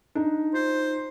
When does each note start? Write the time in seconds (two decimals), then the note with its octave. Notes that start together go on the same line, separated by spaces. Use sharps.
0.15 D4 D#4
0.54 F4 C5